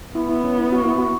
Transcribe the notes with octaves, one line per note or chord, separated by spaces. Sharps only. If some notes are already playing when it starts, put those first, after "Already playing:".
B3 E4
E4
C#4
E4
F#4
E4
F#4